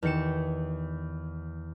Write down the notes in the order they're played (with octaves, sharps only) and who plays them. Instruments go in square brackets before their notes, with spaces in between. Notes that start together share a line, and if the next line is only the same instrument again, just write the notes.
[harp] E2 D#3 G4 C#7 E7